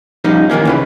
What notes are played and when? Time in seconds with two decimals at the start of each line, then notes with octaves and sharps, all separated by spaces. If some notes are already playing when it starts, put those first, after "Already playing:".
0.24 F3 G3 C#4 D#4
0.50 D#3 E3 A#3 C#4
0.65 C#2 C#3 B4